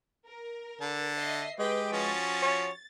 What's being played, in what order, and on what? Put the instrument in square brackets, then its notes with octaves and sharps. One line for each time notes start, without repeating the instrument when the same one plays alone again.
[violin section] A#4
[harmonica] D3 A5
[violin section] D#5 E5 C7
[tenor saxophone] G#3 [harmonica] G4 [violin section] B4 G5
[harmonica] F3 C#4 F#4 [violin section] A6
[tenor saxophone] C#5